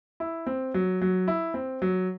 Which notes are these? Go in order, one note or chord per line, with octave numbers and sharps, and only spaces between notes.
E4
C4
F#3
F#3
E4
C4
F#3